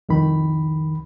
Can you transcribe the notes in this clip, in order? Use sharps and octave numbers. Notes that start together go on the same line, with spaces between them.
C2 F2 D#3 B5